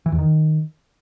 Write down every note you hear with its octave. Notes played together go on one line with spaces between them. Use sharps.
E3
E2
D#3